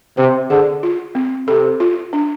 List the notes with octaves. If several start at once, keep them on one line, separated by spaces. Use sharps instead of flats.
C3 C5
D3 G#4
F4
C4
C3 A4
F4
D4